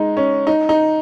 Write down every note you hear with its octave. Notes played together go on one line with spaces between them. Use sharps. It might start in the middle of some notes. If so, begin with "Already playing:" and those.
Already playing: G#3 D#4
C#4
D#4
D#4